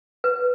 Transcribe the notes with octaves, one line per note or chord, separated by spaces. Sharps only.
B4